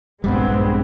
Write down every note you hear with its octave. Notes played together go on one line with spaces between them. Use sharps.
A#1 G2 G3 G#3 B3 C4